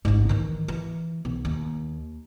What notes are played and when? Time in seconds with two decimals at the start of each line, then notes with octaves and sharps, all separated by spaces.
0.05 A1 G#2
0.29 D#3 E3
0.68 E3
1.25 B1
1.45 D#2